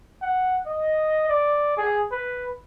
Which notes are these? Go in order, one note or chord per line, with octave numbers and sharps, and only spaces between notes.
F#5
D#5
D5
G#4
B4